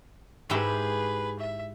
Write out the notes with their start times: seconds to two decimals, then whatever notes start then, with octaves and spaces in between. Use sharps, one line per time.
0.50 G#2 E4 G4 G#4 B4
1.40 E5